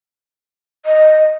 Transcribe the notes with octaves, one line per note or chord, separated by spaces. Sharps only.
D#5